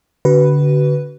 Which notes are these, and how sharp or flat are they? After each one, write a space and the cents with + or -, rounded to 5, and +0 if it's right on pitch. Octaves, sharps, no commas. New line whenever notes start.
D3 -20 F#4 +35 B4 +0